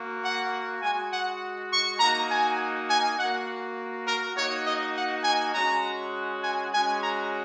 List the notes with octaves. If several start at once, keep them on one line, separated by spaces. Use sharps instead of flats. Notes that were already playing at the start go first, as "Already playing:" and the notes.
Already playing: A#3 F#4
F#5
G#3 F#4 G#5
F#5
C#6
A#3 D#4 F#4 A#5
G#5
G#5
A#3 F#4 F#5
A#4
A#3 D#4 F#4 C#5
D#5
F#5
G#5
G#3 C#4 F#4 A#5
G#5
G#3 C#4 F#4 G#5
A#5